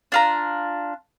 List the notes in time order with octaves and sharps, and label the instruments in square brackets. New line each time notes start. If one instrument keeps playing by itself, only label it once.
[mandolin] D4 F4 A#5